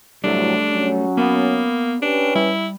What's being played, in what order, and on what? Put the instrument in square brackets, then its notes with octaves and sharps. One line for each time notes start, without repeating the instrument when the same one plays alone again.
[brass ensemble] C2 A2 F#3 [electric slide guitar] G3 A3 [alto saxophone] D4
[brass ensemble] F#3 C#4
[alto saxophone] A#3 [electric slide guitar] B3 F#5
[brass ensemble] C#4 G4 B4 [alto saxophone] D4
[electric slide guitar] G3 [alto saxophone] E4